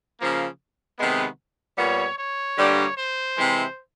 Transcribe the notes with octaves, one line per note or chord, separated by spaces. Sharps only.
C#3 F3 A#3
C3 D#3 G#3 B3
A#2 G3 B3 C#5
C#5
G2 D3 G3 A#3
C5
C3 E3 G#3